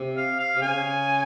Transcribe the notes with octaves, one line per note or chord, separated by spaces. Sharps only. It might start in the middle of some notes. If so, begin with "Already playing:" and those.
Already playing: C3
F5
F5
C3
C#3 G#5